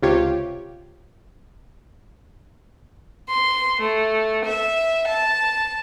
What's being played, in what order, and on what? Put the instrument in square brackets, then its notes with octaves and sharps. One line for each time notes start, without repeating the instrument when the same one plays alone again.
[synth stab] C#2 C3 F4 G4 C#5
[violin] C6
A3
E5
A5